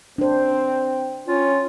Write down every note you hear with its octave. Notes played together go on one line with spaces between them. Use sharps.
C4 D4 C5
C#4 F4